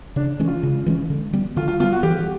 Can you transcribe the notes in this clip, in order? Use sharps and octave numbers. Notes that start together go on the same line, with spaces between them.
C#3 D4
E3 G#3 C#4
F4
C#3
E3 G#3 C#4
D3
G3 B3
D3 F4
F4
G3 B3 F4
F#4
E3 G4